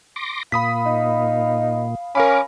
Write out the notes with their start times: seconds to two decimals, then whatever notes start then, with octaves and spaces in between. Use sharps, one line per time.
0.16 C6 D6 A#6
0.52 A#2 F5 B5 D#6 B6
0.86 D#4
2.15 C#4 A#4 F5 B5 D6